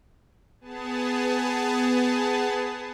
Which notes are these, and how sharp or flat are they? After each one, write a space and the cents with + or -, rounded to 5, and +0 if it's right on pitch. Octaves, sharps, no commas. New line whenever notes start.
B3 +20 G#4 +0 A5 +0